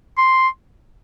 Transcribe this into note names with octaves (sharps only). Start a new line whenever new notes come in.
C6